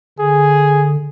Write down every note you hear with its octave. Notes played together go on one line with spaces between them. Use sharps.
D3 G#4